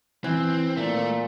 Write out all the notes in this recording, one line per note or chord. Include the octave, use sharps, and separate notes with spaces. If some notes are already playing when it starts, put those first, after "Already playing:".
E3 C4
A#2 A3